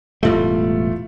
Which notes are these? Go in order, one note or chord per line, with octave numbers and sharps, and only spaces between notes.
E1 A2 G3 A3 F4